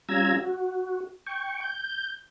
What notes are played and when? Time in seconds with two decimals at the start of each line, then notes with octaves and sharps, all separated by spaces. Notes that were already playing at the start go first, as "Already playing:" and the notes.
0.09 G3 C#4 F4 A#5 E6 G#6
0.41 F#4
1.27 G5 C#6
1.61 G6